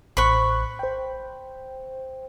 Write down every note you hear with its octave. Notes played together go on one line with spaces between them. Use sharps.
A1 C5 B5 C#6 F#6
C5 G5